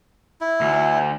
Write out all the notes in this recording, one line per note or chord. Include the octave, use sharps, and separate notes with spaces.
E4
D2